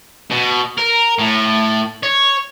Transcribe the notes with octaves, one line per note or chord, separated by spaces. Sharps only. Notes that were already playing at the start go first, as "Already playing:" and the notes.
B2
A#4
A2
C#5